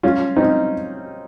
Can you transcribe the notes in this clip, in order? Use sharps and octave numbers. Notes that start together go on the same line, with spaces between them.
C#4 F4
C4 D#4